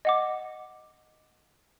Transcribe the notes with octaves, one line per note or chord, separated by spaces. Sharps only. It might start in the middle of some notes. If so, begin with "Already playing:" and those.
D#5 F#5 D6